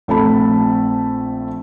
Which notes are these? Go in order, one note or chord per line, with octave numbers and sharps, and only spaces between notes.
A#1 A3 C4 A5 B5